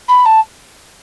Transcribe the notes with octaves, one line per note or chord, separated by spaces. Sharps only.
B5
A5